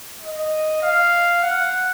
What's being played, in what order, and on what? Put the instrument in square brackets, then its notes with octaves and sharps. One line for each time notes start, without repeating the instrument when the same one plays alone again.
[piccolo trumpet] D#5
F5
F#5